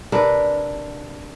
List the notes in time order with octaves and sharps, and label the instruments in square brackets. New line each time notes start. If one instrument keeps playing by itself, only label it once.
[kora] C3 D4 A#4 B4